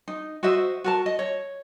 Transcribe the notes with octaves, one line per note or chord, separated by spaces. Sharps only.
D#4
F#4 C5 D#5 E5
F#4 A#4 A5
D#5
C#5